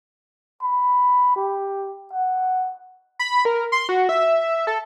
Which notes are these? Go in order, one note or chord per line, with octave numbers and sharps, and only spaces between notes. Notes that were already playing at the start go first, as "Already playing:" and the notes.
B5
G4
F#5
B5
A#4
C6
F#4
E5
A4